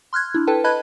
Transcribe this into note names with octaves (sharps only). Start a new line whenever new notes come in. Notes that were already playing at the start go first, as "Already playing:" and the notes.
C6 F6 F#6 G#6
D4 E4
A4 B4 G5 A5
B4 D#5 A5 B5 F#6 G#6